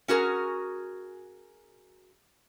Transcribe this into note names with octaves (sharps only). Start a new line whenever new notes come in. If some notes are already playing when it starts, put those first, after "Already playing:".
C#4 F#4 G#4 A#4